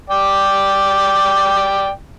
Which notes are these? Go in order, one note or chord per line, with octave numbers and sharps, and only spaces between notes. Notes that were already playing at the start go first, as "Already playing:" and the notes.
D5 G5